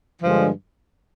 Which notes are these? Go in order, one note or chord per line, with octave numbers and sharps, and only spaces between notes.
G2 D3 F3 G#3